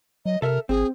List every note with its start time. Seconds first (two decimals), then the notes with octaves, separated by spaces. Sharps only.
0.25 F#3 D#5
0.42 C3 A4 A#4 E5
0.69 G#1 C4 G#4